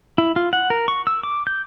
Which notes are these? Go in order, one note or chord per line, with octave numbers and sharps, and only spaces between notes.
E4
F4
F#5
A#4
C#6
E6
D6
G6